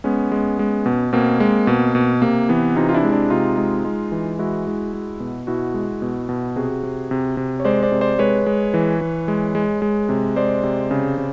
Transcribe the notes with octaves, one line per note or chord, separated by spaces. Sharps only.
G#3 B3 C#4
G#3
G#3
B2
B2 A#3 C4
G#3
B2
B2
C3 A#3
E3 B3
C3 D#4 F4
F4
D4 E4
G#3
D4 E4
C3 D#4 F4
G#3
G#3
E3
G#3 E4 F#4
G#3
G#3
B2
B2 E4 F#4
G#3
B2
B2
C3 F#4 G#4
C3
C3
C3
C#5
G#3 C5 D5
C5 D5
C3
C5 D5
G#3 B4 C#5
G#3
E3
E3
G#3
G#3
G#3
C3
G#3 C5 D5
C3
C#3
C#3